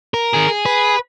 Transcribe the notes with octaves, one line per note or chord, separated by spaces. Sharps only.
A#4
D#3 G#4
G#4
B4